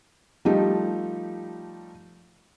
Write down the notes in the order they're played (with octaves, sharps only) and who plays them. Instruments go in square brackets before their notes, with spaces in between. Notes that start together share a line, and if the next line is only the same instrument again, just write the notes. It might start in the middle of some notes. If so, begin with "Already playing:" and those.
[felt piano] F3 G3 A3 D#4 G4